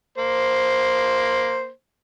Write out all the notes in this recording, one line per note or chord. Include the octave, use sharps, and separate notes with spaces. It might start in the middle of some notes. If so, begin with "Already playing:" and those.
A#3 C5